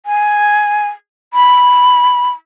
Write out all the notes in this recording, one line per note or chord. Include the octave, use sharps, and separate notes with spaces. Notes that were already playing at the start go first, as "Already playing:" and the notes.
G#5
B5